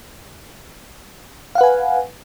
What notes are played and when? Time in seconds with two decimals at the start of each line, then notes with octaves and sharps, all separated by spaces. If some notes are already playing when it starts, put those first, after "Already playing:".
1.55 F5
1.58 F#5
1.61 B4
1.63 G#5